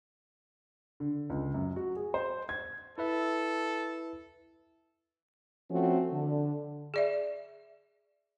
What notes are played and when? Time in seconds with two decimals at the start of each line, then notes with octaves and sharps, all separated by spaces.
1.00 D3
1.30 C#2
1.54 F#2
1.76 F#4
1.96 G#4
2.14 C5
2.49 G#6
2.98 E4 A4 B4 E5
5.71 F3 A3 C4 C#4 F#4
6.12 D3
6.94 G#4 D5 E5